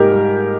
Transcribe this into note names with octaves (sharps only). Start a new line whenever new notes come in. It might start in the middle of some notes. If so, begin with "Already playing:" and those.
Already playing: G#2 G3 D#4 G4 A#4
G3